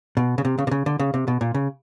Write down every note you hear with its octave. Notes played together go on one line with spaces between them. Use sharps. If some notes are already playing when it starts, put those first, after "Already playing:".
B2
C#3
C3
C#3
C3
C#3
D3
C#3
C3
B2
A#2
C#3